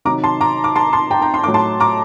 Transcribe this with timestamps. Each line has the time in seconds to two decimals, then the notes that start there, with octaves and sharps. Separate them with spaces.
0.05 C3 D#3 F#3 A#5 D6
0.24 A5 C6
0.41 A#5 D6
0.64 D6
0.76 A5 C6
0.93 A5 C6
1.11 G5 A#5
1.22 G5 A#5
1.34 C6
1.44 A2 F#3 D6
1.54 A5 C6
1.80 A#5 D6